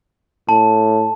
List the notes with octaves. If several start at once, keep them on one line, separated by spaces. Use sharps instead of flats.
A2 A5